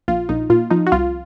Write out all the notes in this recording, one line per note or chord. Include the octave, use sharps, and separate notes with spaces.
A#1 F4
A#1 D#4
A#2 F4
F3 D#4
F#4
C2 F4